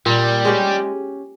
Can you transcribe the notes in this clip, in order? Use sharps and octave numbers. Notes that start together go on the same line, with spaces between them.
A#2 G3
G#3 C#4 G4